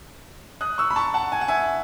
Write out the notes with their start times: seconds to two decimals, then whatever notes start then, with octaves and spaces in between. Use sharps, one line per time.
0.61 D#6 F#6
0.78 C#6 E6
0.91 B5
0.96 A5 C#6
1.14 F#5 A5
1.32 G#5
1.41 F#5
1.48 E5 G#5